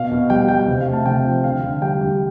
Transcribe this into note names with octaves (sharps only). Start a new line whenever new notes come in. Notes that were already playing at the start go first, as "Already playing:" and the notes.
Already playing: B2 F5
B2
G3 G5
G3 G5
C3
F5
A3
A5
C3 G5
F3
D3 F5
D3
G3 G5
G3